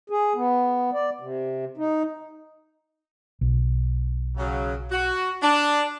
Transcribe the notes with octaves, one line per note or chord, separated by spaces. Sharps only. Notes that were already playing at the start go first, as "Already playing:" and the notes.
G#4
B3
D5
C3
D#4
B1
C#3 F#3
F#4
D4